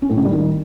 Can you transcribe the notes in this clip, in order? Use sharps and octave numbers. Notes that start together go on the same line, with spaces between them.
C#4
A2
C#3
G3
D#3